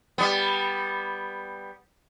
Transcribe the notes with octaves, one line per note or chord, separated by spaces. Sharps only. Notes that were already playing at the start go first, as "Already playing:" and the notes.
G3 B3